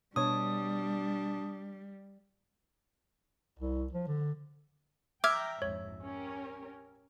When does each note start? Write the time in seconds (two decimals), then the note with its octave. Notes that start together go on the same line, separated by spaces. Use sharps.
0.16 B2 G3 D4 C#5 D#6
3.59 C2
3.92 F3
4.08 D3
5.24 E5 G5 A#5 D6 F6 G#6
5.62 A#1 F2 G#2 C#5
6.03 C#4 G4 A#4